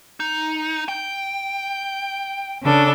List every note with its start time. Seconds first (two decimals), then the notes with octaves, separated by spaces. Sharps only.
0.20 D#4
0.88 G5
2.61 C#3 D4 A4